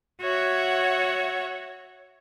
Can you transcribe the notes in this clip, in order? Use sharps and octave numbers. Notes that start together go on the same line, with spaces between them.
F#4 C#5 E5 F#5